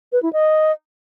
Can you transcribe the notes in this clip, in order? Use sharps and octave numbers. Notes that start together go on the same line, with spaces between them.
B4
E4
D#5